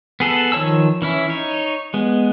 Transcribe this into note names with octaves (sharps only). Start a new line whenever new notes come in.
B3 G#4 A4 B4
D#3 F3 C#5 A5 E6
E3 C#4 E4
D#4 C#5
G#3 B3